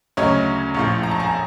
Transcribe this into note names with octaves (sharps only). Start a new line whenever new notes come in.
D2 C#3 F#3 C#5 D#5
A#1 A2 F3
A#5
A5
G#5 A#5